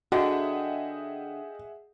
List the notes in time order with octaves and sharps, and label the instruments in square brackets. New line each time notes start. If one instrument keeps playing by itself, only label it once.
[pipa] D3 [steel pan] F#4 [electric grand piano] G#4 E5 F#5 [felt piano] D#5 G5